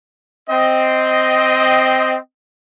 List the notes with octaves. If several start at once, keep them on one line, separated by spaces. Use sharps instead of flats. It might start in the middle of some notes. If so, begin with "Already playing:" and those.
C4 D#5